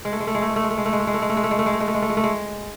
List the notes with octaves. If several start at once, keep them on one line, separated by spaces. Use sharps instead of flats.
G#3
A3
G#3
A3
G#3
A3
G#3
A3
G#3
A3
G#3
A3
G#3
A3
G#3
A3
G#3
A3
G#3
A3
G#3
A3
G#3
A3
G#3
A3
G#3
A3
G#3
A3
G#3